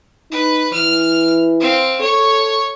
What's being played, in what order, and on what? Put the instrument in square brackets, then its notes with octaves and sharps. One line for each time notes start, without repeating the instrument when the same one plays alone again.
[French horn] D#4 [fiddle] B4
[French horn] E3 [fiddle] F6
[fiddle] C4 F5
[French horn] A4 [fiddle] C#5 C#6